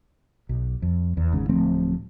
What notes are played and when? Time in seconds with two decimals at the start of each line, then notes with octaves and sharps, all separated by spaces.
0.49 B1
0.82 F2
1.17 E2
1.32 G#1 G#2 C#3
1.49 D1 F3 A3 C4